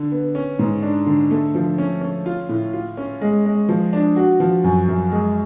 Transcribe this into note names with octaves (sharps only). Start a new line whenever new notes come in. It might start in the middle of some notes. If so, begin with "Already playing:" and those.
Already playing: D3
B3
C#4
G#2
D4
D3
A3
F3
C#4
C#4
F4
A2
F4
C#4
G#3
G#3
F3
D4
F#4
F3
F#2
F#2
G#3